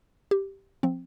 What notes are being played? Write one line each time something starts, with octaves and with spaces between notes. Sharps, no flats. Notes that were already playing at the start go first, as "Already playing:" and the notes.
G4
F3 C4